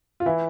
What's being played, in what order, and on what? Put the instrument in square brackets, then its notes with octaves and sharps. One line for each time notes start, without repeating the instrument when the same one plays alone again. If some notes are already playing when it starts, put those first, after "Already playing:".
[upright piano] F4
E3 E4